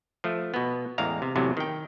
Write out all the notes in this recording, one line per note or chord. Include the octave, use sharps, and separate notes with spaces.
F3 A3
B2 B3
A1 E2 G#3 F5 A#5
C3
E2 A2 C3 F#3
D#3 G5